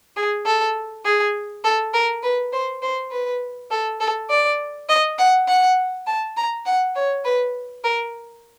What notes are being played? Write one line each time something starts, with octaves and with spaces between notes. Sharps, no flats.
G#4
A4
G#4
A4
A#4
B4
C5
C5
B4
A4
A4
D5
D#5
F#5
F#5
A5
A#5
F#5
C#5
B4
A#4